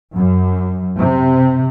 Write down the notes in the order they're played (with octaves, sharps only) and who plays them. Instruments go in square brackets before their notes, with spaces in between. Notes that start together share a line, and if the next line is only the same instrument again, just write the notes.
[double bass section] F#2
C3